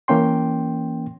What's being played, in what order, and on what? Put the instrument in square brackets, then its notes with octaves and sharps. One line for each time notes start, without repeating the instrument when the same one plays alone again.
[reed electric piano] E3 A#3 C#4 G5 C6